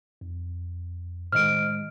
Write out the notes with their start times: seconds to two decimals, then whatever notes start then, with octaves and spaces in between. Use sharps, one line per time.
0.21 F2
1.32 A2 D#3 G#3 C5 D#5 F6 D7